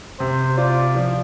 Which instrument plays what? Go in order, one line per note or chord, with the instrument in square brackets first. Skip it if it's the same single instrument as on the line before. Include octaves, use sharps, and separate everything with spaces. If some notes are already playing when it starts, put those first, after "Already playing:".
[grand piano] C3 [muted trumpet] C5
[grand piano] F4 [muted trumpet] D5
[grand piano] F3